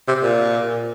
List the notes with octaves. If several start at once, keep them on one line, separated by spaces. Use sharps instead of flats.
C3
A#2